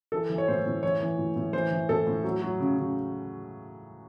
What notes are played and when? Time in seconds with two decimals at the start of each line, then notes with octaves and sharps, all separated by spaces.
0.12 E3 A4
0.30 E3
0.38 C#5
0.48 A2 C5
0.66 A2
0.83 E3 C#5
1.01 E3
1.18 A2
1.36 A2
1.53 E3 C5
1.71 E3
1.89 A2 A4
2.07 A2
2.24 F#3
2.42 F#3
2.60 C#3
2.77 C#3